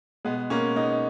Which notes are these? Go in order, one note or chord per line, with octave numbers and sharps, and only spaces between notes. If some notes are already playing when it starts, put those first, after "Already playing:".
B2 G#3 B3
G#3 A#3 C#4
G#3 B3 D#4